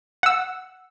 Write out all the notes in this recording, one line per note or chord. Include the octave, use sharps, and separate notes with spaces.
F#5 E6